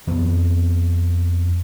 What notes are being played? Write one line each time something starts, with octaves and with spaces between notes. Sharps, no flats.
F2 B3